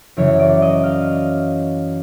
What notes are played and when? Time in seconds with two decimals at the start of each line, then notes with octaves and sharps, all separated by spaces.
0.17 F#2 C#3 E3 C#5
0.39 D5
0.62 D#5
0.83 F5